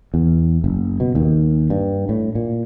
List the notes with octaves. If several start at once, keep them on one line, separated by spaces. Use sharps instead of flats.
E2
F#1
B2
D#2
G2
A2
A#2